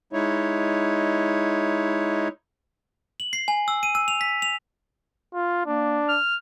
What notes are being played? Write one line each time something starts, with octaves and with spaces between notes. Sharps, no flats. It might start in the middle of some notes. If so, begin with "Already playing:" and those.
G#3 D#4 E4 C#5
F#7
C7
G#5
E6
D#7
E6
F7
B6
F7
F4
A#3 D4
F6